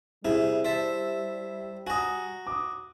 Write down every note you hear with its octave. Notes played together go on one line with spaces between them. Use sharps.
C3 G3 E4 G#4
C5 E5 A5
F#4 G#5 A#5 D#6
D6 D#6